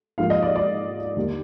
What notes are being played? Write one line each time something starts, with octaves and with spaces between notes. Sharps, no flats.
G#2 F3 A#3 F5
D#5
D5
D5
D#2 D3 G3 A#3